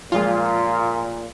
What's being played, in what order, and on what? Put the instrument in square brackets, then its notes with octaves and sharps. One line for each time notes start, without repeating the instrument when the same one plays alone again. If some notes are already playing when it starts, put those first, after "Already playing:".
[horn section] A#2 [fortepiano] F3 G#3 [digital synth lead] F4